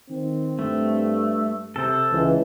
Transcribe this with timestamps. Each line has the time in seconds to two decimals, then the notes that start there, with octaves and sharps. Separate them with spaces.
0.10 D#3 C4
0.59 G2 A3
1.76 C3 A4 C5
2.12 C#2 E3